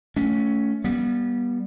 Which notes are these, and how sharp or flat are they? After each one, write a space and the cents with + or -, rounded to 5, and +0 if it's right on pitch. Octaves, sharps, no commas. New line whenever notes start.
A3 +0 C#4 +15
G3 +0 B3 -30